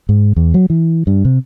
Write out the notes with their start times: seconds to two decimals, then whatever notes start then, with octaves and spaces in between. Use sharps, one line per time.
0.09 G#2
0.36 E2
0.54 F#3
0.70 E3
1.07 G2
1.25 C3